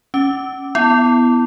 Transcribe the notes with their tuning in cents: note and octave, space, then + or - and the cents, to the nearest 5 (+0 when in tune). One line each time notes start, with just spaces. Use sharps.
C#4 +0 D6 +0
B3 +0 E4 +0